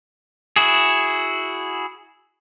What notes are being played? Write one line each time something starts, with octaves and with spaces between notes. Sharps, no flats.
E4 F#4 G#4